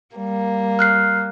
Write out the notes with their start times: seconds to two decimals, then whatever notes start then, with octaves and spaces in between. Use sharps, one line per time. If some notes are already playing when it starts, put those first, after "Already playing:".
0.14 G3 A#3
0.79 F6 F#6 C7